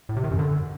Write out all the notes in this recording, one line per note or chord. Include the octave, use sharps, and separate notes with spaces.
A2
C3
D#3
F#2
D3